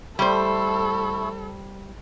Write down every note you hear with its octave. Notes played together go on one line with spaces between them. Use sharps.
G3 A3 E4 A4 C5